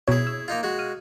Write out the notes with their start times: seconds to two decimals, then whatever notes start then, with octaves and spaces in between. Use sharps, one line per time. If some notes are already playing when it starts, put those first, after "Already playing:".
0.08 B2 E4 G#4 C#5
0.27 E6
0.48 A#3 D#4 F4
0.63 G#3 F#4
0.79 F6 D#7